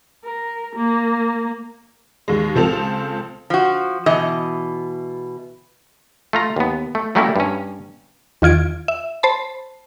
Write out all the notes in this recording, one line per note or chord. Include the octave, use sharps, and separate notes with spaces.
A#4
A#3
D#2 G#3
C#2 F3 C4 A4 F7
F3 F#4
B2 E3 D#5
A3 F4 A#5
D#2 B3
A3
F#3 G3 A3 A#3 C#4 E4
G2 C#4
E2 D#3 F4 G#6 D7
E5
C5 A5 B5